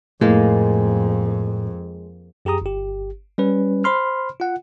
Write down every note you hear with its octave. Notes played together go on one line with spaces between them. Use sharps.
F2 A2 G#3 A#3
F#2 G4 G#4 A#5 D#6
G1 G4
G3 C#4 B4
C5 B5 C6 F6
F4 F#5